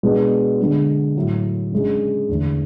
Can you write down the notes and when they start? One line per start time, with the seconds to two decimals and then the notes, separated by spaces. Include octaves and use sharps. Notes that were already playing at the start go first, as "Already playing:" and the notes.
0.03 B2 G#3 B3 D4
0.60 D3 G#3 D4
1.16 A2 F#3 A3
1.72 C#3 G#3 D4
2.29 E2 D3 A3